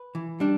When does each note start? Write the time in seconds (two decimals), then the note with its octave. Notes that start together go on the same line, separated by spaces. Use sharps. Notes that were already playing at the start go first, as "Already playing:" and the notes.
Already playing: B4
0.15 E3
0.40 G3 D4